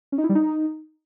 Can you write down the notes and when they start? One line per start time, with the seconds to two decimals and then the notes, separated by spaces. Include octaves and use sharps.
0.12 C#4
0.18 D#4
0.24 E4
0.29 G3
0.35 D#4